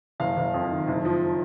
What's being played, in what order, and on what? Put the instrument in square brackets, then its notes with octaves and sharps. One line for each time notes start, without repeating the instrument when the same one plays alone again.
[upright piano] F#1 F5
F#1
F2
D#3
F#1
F3